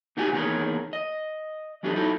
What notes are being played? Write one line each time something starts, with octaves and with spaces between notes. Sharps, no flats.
D#2 D#4 F#4 G4 F5 G#5
E2 D#3 A#3 D4 G#4 C#5
D#5
E3 F#3 D4 D#4 G4 A4
D#4 E4 F#4 A4